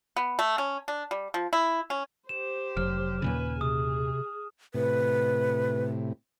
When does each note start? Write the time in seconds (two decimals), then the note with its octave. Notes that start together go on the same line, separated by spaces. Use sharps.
0.17 B3
0.39 A3
0.58 C#4
0.88 D4
1.11 G3
1.34 F3
1.53 E4
1.90 C#4
2.29 G4 C5 E7
2.77 F1 F#3 F6
3.22 D#2 A#2 C#3 B4 G#5
3.61 C3 G#4 D#6
4.74 A2 C3 B4